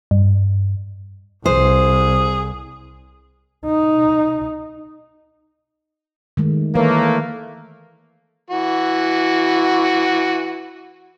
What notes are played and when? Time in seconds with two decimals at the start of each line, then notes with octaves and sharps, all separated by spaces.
0.11 G2
1.46 C2 G#4 C5
3.66 D#4
6.37 D#3 G#3 A3
6.75 E3 A3 A#3 B4 C#5
8.50 E3 F#4